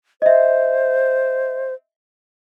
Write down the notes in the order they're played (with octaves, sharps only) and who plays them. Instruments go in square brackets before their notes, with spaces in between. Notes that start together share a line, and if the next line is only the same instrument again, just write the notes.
[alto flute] C5 [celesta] D#5 E5